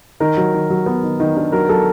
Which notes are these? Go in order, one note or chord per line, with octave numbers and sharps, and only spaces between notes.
D#3 A#4
F#3
D#3
F#3
B3
D#3
D#3
D4
F#3 A#4
F#3 A4